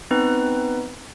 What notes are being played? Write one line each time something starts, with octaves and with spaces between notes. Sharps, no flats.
B3 C4 D#4 B4